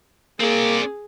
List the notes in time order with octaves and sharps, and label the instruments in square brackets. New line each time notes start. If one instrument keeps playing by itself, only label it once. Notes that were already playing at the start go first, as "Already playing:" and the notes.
[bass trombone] A#3 [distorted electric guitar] C4 D5 [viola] G#4